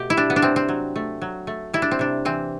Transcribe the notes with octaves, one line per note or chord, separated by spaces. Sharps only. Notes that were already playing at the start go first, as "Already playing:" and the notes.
Already playing: B2 A3 G4
E4
G3 D4
B3
D4
C3 C4
C4
F#3
A3
F#3
A3
G3 E4
D4
C4
C3 D4
E3 C4